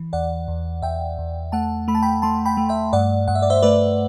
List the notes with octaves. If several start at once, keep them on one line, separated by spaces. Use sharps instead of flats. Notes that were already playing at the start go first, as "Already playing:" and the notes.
Already playing: E3
E2 D5 F#5
E2
E2 E5 G5
E2
A3 F#5 A5
A3 B5
A5
G5 B5
A3 A5 C6
G5 B5
A3
E5 G5
G2 D5 F#5
G2 F#5
E5
D5
C5 E5
A3 B4 D5